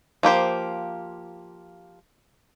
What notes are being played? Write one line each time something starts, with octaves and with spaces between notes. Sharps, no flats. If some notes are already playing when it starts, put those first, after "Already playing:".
F3 A#3 G4 C5